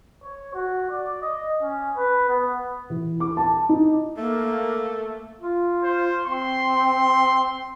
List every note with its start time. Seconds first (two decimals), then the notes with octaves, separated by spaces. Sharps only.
0.23 C#5
0.54 F#4
0.90 D5
1.22 D#5
1.62 C#4
1.97 B4
2.28 B3
2.90 E3
3.20 D6
3.37 A5
3.69 D#4
4.17 A3 A#3
5.40 F4
5.83 C5
6.26 C4 C6